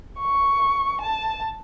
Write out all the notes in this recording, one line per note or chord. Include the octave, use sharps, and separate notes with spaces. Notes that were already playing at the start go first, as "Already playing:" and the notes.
C#6
A5